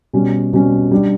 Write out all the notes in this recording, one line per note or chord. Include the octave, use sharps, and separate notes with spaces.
B2 G3 C#4
B2 G3 C#4
G3 D4 G4